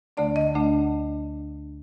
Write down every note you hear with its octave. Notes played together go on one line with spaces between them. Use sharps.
D2 D3 A3 D4 D5
D#5
D2 D3 A3 D4